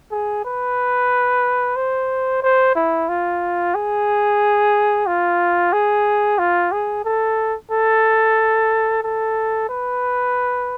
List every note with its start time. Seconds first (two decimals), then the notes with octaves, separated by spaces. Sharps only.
0.11 G#4
0.45 B4
1.76 C5
2.43 C5
2.76 E4
3.09 F4
3.75 G#4
5.07 F4
5.73 G#4
6.39 F4
6.72 G#4
7.05 A4
7.71 A4
9.03 A4
9.69 B4